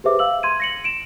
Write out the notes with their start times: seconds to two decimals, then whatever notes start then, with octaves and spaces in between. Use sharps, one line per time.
0.04 G4 G#4 B4 C5 E5 D6
0.19 F5 E6 F#7
0.43 C6 G#6 D#7
0.60 A#6 C#7 F#7
0.84 D7 E7